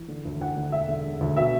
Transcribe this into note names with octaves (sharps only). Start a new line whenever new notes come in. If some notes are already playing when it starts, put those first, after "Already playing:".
Already playing: E3
D3
D2
D2 F#5
D3
E1 E5
D3
E1
D2
B2 E5